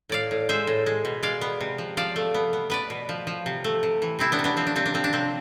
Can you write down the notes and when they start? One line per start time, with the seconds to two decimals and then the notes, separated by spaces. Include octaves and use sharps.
0.09 A2 D5 F5
0.31 A2
0.49 G#3 C5 E5
0.67 A2
0.86 G#3
1.05 B2
1.23 G#3 D5 F5
1.41 B3
1.61 C3
1.78 F3
1.97 F3 D5 F5
2.16 A3
2.34 B3
2.53 B3
2.70 B3 B4 D5
2.90 B2
3.09 F3
3.27 F3
3.46 C3
3.64 A3
3.83 C3
4.02 E3
4.19 C3 C4 E4
4.32 B3 D4
4.39 C3
4.44 B3 D4
4.57 F3 C4
4.67 D4
4.76 C3 C4
4.86 D4
4.94 F3 C4
5.04 D4
5.13 C3 C4